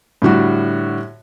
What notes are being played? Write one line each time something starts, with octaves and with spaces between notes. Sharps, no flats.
A2 D3 G3 F#4